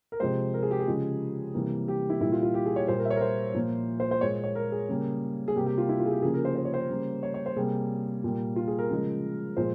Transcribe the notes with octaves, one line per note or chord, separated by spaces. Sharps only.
A#4
C3 F3 G#3 C5
A#4
G#4
G4
G#4
C#3 F3 G#3
C3 E3 G3 A#3
G4
E4
A#2 G3 A#3 E4
F4
F4
G4
G#4
C#5
A#2 G3 A#3 C5
A#4
E5
C#5
A#4
C5
A#2 F3 A#3
C5
C5
A#2 G#3 C#5
C#5
A#4
G#4
C#3 G3 A#3
G#4
C3 G3 A#3 G4
G4
F4
E4
F4
G#4
G4
C#3 F3 A#3 G#4
A#4
C5
C5
C#5
C5
C#3 G3 A#3
C#5
C#5
C5
C3 G3 A#3 G#4
A#2 G3 A#3
F4
G#4
A#4
C#3 F3 G#3
A#2 F3 G#3 C5